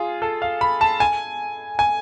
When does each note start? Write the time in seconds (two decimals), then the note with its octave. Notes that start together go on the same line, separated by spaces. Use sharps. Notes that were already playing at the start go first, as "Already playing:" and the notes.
Already playing: F4 G#4
0.22 A4
0.42 F5
0.61 B5
0.81 A5
1.00 G#5
1.79 G#5